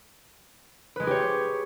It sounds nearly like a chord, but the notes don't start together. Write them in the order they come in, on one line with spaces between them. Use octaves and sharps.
B4 G#3 G#4 G4 C#5